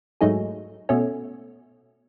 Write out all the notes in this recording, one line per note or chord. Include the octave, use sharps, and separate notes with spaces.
G#2 F#3 A3 D#4 G#4
B2 A3 C#4